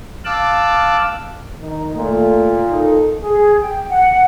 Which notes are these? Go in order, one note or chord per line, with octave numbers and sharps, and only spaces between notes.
F5 A5 D6 E6 F#6
D#3 D#4
A#2 A3
D#4 A4
G#4
G5
F#5